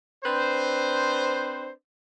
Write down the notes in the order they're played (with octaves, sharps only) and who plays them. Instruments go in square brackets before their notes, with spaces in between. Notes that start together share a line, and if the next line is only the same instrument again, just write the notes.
[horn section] C4 D4 B4 C5